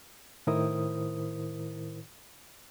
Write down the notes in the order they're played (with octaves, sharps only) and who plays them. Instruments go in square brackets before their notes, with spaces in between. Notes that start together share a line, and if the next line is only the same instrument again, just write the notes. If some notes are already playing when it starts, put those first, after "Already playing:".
[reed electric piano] A2 D#3 E4 A#4 C5 D#6